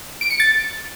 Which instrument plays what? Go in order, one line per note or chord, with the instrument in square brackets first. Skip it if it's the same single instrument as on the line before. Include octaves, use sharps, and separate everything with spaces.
[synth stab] D7
C#7
A6